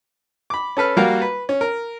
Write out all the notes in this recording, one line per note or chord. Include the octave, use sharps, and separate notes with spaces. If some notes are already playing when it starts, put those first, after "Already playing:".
B5 D6
C#4 A4 B4 F6
G3 A#3 F#4 A#4 F5
B4
C#4
A#4